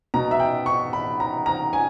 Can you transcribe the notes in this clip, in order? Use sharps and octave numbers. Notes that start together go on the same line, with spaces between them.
B2 A#5
E5
G5
C#6
B5
A#5
A#5
G#5